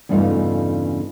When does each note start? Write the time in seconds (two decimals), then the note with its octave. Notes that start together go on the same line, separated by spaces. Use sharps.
0.09 E2 G2 C#3 A3 D#4 F4